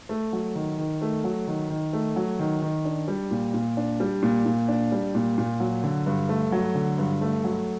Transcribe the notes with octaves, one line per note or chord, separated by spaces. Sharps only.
A3
F#3
D#3
D#3
A3
F#3
D#3
D#3
A3
F#3
D#3
D#3
D4
G3
A#2
A#2
D4
G3
A#2
A#2
D4
G3
A#2
A#2
F#3
D3
G2
A3
F#3
D3
G2
A3
F#3